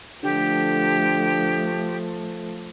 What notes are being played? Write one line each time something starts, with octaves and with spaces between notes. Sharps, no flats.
D3 F3 A3 G4